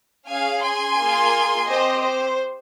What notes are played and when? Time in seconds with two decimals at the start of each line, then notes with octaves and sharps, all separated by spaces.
0.30 C#4 G#4 F5 G#5
0.64 G#5 C6
0.99 A#3 F4 G#4
1.68 C4 G4 C5 D#5
2.02 C5